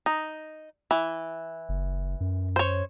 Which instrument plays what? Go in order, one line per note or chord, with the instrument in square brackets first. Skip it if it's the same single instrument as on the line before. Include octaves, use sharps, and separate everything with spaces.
[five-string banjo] D#4
E3
[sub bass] F#1
F#2
[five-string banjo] C5 C#5